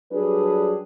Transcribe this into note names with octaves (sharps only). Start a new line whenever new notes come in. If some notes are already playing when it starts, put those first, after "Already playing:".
F#3 G3 D4 G#4 A4 B4